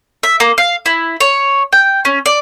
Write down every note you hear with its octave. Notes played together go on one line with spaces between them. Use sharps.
E5
A#3
F5
E4
C#5
G5
C#4
D5